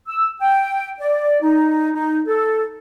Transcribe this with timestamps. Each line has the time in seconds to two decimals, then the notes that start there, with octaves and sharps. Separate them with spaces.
0.08 E6
0.41 G5
0.99 D5
1.42 D#4
1.94 D#4
2.27 A4